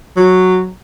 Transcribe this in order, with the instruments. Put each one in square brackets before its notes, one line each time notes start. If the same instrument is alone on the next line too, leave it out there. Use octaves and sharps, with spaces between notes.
[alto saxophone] F#3